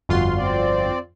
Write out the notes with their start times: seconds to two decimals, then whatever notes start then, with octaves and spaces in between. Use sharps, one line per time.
0.09 G1 F2 F4 F#4 C6
0.38 C4 D5